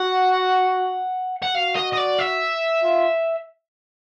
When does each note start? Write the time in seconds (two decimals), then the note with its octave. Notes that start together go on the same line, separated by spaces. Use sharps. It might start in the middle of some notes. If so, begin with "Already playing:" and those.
Already playing: F#4 F#5
1.43 F#5
1.54 F#4 F5
1.76 D#5
1.93 D#5
1.98 D5
2.19 E5
2.83 F4